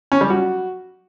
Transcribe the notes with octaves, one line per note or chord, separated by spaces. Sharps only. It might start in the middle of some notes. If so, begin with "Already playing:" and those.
C#4
G3
F#4